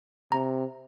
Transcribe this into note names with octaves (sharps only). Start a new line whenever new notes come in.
C3 A#5